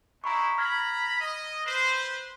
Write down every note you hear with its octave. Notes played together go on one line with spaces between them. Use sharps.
G#3 D#4 E4 A#5 B5 C#6
A#5 B5 F6 G#6
D#5
B4 C5